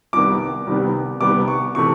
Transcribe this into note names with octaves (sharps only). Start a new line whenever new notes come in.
C2 C3 D#3 G3 B3 D6
C2 C3 D#3 G3 B3
C2 C3 D#3 G3 B3 D6
C#6
C3 E3 A3 C#6